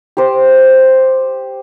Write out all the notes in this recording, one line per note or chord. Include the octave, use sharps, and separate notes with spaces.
G4 C5